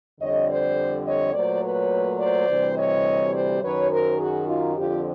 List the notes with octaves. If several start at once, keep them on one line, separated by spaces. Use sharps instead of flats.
F2 D3 G3 C#5 D#5
C5 D5
C#5 D#5
A#2 F#3 A3 C5 D5
B4 C#5
C5 D5
D2 C3 E3 G3
C#5 D#5
C5 D5
F#2 D#3 F#3 B4 C#5
A#4 C5
F#4 G#4
D#4 F4
F2 D3 F3 F4 G4